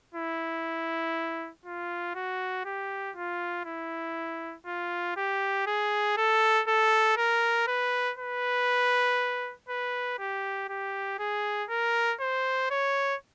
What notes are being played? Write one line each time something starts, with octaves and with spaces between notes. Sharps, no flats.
E4
F4
F#4
G4
F4
E4
F4
G4
G#4
A4
A4
A#4
B4
B4
B4
G4
G4
G#4
A#4
C5
C#5